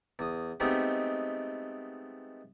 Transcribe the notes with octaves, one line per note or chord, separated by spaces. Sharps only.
E2 D#6
G#3 A3 B3 C4 D#4 G4